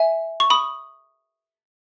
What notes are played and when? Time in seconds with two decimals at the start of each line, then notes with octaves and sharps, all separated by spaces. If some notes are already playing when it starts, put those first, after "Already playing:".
Already playing: E5 G#5
0.40 C#6
0.50 B5 D#6